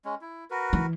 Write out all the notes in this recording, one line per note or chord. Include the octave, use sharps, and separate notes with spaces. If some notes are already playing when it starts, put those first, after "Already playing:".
G#3 C#4
E4
F#4 A#4 B4
E3